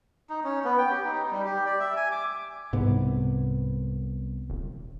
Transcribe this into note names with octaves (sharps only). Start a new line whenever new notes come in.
D#4
C#4
B3
G5
G4
D#4
G3
G4
D5
E5
G#5
D6
C2 G#2 C3 B3
D#1